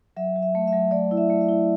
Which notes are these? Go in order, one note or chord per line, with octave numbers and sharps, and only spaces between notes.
F#3 E5
F#3
E5
A3
E5
F#3
A3 D5
E4
E5
A3
E5
E4